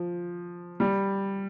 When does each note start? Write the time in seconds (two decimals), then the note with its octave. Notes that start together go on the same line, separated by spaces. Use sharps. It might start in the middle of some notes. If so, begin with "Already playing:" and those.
Already playing: F3
0.80 G3